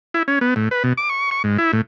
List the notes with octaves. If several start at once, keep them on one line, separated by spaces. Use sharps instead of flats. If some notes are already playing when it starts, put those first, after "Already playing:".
E4
C#4
B3
A2
B4
B2
D6
C#6
C#6
G#2
E4
A2